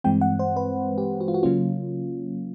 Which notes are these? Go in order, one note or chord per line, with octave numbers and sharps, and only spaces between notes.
G2 E3 G#3 C4 G5
F#5
C5
B4
G4
F#4
F4
F#4
C#3 F#3 A#3 C#4 F4